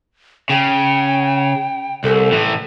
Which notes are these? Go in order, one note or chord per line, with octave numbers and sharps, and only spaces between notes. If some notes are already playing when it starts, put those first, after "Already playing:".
C#3 G5
C2 A4
A2 E3